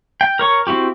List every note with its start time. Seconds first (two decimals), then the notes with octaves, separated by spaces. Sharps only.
0.21 G5
0.39 A#4 C#5 C#6
0.67 C4 E4 F#4 G4